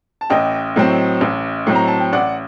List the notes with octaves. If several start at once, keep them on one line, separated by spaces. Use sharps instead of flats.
A5
A1 D#5 G5
A2 F#3 C4
A1
A2 F#3 C4
A#5
A5
G5
A1 D5 F#5